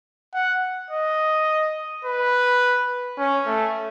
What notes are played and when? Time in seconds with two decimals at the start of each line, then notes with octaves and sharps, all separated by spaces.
0.34 F#5
0.90 D#5
2.05 B4
3.19 C#4
3.47 A3